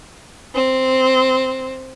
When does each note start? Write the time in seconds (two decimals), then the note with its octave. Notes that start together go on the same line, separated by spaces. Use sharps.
0.53 C4